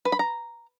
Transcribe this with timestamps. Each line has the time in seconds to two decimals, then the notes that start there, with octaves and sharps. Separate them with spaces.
0.05 B4
0.12 B5
0.19 A#5